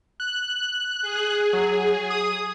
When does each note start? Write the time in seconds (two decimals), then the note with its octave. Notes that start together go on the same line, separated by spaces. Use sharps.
0.20 F#6
1.02 G#4
1.53 F#3
2.10 D#6